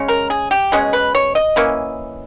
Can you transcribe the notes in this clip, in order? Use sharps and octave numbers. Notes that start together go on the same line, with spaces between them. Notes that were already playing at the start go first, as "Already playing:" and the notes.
Already playing: C#3 G#3 C#4
A#4
G#4
G4
B2 G#3 C#4 G#4
B4
C#5
D#5
E3 A#3 C#4